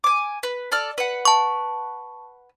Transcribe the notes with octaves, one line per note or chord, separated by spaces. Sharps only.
G#5 D6
B4
A4 D5 F6
B4 F#5
A5 C#6